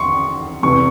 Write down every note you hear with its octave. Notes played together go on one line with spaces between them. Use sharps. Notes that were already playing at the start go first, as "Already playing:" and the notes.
Already playing: E2 E3 C6 C#6
E2 C3 E3 C#6